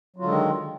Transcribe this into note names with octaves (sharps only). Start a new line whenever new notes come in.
D3 D#3 F#3 G#3 F4